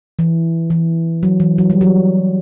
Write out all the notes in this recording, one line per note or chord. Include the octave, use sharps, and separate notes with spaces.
E3
E3
F#3
E3
F#3
G3
F#3